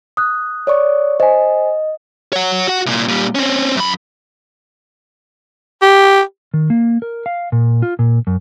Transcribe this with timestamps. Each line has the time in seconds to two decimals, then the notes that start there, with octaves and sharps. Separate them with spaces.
0.17 D#6 F#6
0.67 C#5 D5 C#6
1.20 C5 D#5 G#5
2.33 C#5 F#5
2.67 F#4 F#5
2.86 C2 A#2
3.08 A#2 G3
3.35 C4 C#4
3.77 F#2 B5
5.82 G4
6.54 D#3
6.70 A#3
7.02 A#4
7.26 F5
7.52 A#2
7.82 F4
7.99 A#2
8.27 F#2